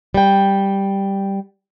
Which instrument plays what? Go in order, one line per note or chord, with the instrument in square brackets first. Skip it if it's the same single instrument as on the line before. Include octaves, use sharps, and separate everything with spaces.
[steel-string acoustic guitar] G3 G5